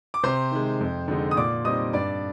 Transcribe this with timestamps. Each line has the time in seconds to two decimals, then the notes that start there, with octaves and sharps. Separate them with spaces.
0.14 D6
0.23 C3 C5 C6
0.52 D#3 G#3
0.80 F2
1.08 D3 G#3 D#4
1.31 D#6
1.36 A#2 D5 D6
1.64 G3 C4 D#4 D#5 D#6
1.93 G2 D5 D6